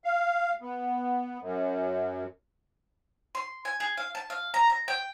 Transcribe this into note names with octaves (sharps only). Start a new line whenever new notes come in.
F5
B3
F#2
C6
G#5
G#4
F5
A5
F5
A#5
A#5
G5